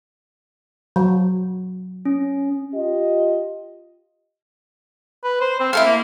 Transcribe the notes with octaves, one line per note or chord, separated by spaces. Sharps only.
F#3
C#4
F4 G4 D#5
B4
C5
C4
E4 A4 F5 C6
A#3